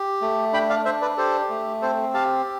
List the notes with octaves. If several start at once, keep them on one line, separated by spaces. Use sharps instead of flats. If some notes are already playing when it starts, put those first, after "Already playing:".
Already playing: G4
A3
D4 G5 B5
D5 F5
D4 C5 E5
B4 D5
G4 A4 C5
A3
C4 A4 C5
G4 F5 A5